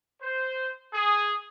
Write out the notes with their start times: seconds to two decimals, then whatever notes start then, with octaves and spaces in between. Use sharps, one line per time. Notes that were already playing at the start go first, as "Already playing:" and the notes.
0.23 C5
0.94 G#4